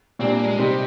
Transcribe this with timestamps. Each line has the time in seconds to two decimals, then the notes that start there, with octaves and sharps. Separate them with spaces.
0.19 A#2 G3 C4 D4
0.32 A#3
0.45 G#3
0.57 C3 G3 C4 D#4 G4 C5